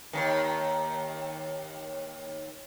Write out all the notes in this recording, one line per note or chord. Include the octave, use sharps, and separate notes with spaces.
D#2 G#2 D#3